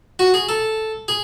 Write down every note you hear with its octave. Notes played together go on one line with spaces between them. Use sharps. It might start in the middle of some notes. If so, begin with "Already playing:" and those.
F#4
G#4
A4
G#4